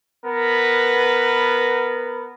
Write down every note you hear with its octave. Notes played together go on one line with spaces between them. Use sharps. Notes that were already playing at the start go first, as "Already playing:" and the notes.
B3 A#4 B4